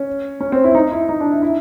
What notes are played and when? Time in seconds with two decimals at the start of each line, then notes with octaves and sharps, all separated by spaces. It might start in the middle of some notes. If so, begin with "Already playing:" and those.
Already playing: C#4
0.40 C#4
0.52 C4
0.64 E4
0.75 D#4
0.91 E4
1.09 D#4
1.20 D4
1.31 E4
1.42 E4